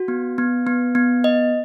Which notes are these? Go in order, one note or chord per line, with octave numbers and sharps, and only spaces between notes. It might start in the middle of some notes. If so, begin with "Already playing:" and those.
Already playing: F#4
B3
B3
B3
B3
D#5